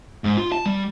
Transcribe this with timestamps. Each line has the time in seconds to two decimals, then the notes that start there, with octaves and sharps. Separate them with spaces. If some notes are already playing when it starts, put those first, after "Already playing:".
0.24 G#2
0.37 F4
0.52 A5
0.66 G3